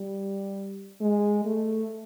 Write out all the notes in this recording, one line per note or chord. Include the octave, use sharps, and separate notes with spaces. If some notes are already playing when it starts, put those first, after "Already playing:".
Already playing: G3
G#3
A3